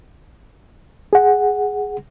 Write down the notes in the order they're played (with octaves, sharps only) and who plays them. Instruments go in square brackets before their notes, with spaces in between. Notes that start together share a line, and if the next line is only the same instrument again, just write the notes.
[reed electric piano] G#4 F#5